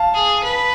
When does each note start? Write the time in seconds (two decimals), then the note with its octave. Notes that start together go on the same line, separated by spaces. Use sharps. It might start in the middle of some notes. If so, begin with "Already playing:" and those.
Already playing: F5 A5
0.14 G#4
0.44 B4